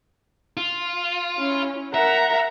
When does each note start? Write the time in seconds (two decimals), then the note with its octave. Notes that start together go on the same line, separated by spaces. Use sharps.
0.57 F4
1.37 C#4 E4
1.94 A#4 E5 F#5 A#5